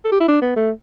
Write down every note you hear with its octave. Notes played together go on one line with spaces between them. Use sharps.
A4
G4
E4
D4
B3
A3